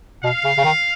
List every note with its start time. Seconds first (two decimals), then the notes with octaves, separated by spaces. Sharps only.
0.24 B2 F5
0.45 C#3
0.58 C#3
0.65 D#3